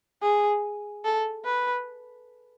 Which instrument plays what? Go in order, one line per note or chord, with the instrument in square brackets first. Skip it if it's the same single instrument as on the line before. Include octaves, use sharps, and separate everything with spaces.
[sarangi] G#4
A4
B4